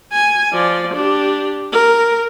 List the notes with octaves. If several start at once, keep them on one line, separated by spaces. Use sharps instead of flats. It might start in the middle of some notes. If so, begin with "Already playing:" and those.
G#5
F3 D5
D4 G4
A#4